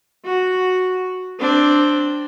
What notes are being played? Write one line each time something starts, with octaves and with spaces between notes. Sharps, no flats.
F#4
C4 D4